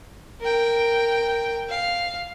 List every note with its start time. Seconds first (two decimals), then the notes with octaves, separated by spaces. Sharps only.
0.41 A#4 G5
1.69 F5